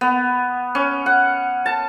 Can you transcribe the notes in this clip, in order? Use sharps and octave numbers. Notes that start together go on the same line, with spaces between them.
B3
C#4
F#5
A5